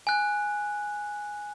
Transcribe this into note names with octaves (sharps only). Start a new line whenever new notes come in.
G#5 F#6